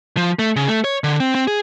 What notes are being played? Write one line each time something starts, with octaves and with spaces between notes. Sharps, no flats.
F3
A3
C#3
A3
C#5
D3
C4
C4
G#4